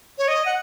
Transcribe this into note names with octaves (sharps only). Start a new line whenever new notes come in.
C#5
D#5
F#5